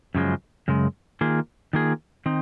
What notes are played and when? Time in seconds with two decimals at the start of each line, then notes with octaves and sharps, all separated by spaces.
0.15 F#2 C#3 F3 G#3
0.68 F#2 C#3 G#3
1.21 D#3 A#3 F4 G#4
1.73 D#3 A#3 F4 G#4
2.26 D#3 C4 D#4